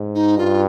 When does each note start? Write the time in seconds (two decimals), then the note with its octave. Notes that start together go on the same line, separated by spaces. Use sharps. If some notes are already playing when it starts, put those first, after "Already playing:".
Already playing: G#2
0.15 D#4
0.37 G2 F4